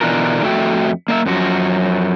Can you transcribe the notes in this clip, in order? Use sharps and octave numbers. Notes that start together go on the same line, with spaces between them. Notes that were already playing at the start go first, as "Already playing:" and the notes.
B2 D3 E3 D4 F4 A#4
F2 A3 F#4 A4 E5 G5
A#3 D5 E5
F#2 F3 F#4